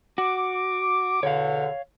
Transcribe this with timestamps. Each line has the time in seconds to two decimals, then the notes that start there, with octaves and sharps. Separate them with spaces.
0.18 F#4 D6
1.23 E2 B2 D3 C#5 F5